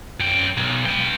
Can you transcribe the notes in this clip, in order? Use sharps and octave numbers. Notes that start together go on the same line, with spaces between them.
F#2 G5
B1
B4 G5